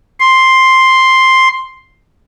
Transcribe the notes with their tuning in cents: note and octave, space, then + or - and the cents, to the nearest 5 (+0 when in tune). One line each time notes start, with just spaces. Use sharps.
C6 +5